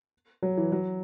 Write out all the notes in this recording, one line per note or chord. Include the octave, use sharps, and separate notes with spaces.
F#3
E3
F#3